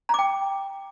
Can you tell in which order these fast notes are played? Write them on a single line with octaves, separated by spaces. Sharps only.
A#5 D6 G5